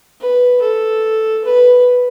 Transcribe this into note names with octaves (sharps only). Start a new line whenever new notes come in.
B4
A4
B4